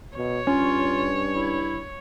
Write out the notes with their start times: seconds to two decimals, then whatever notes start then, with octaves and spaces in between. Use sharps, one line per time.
0.17 B2 C#5
0.47 G2 C#4 F4
1.35 E4